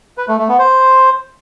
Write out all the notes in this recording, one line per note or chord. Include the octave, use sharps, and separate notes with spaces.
B4
A3
A3
B3
C5